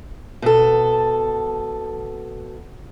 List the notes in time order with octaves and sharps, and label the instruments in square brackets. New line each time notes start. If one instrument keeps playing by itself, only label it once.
[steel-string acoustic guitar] B2 A4